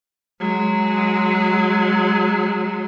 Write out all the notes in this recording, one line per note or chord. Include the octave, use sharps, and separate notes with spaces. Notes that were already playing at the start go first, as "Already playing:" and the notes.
F#3 G#3